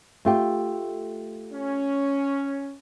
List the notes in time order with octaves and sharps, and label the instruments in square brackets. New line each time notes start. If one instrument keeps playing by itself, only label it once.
[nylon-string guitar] A3 F4 G4
[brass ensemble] C#4